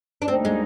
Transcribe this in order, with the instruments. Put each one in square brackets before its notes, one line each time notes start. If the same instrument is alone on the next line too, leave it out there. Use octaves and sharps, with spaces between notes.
[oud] D4
[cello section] D2 D3 G3 A#3 D#4 [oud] C4
[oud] G#3